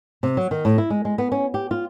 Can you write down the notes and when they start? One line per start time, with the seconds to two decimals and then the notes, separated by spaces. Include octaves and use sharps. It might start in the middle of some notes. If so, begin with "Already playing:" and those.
0.23 C3
0.37 F#3
0.51 D#3
0.65 A2
0.78 E4
0.90 G#3
1.05 G#3
1.18 B3
1.32 C#4
1.54 G4
1.71 F4